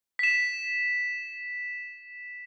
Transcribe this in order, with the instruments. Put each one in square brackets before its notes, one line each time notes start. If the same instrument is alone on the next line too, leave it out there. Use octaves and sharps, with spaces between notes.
[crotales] B6 E7